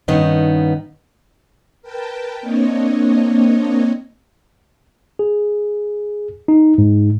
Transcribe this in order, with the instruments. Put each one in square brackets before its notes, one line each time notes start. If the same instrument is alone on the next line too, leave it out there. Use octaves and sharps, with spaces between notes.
[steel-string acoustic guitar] G2 D#3 B3 C#4 D#4
[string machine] A#4 B4 G5 A5
A#3 C4 D4 C#5 D#5
[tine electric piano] G#4
D#4
G#2